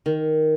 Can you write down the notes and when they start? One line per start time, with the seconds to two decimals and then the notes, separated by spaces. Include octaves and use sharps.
0.06 D#3